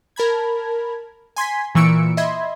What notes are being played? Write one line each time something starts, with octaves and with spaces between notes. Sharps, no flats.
A#4 A5 B5 G#6
G#5 C6 G#6 B6
A#2 E3 C#6 E6 C#7 D7
D#5 E5 B5 C6 G#6